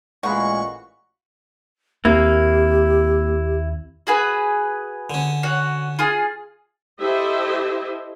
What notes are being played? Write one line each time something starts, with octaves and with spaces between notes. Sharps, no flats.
A1 A#2 G#3 F#4 F5 B5 C#6
D#2 A#3 C4 E4 G4
F#4 G#4 B4
D3 C#4
F#4 C#5
F4 G#4
E4 G4 A4 C5 D#5 E5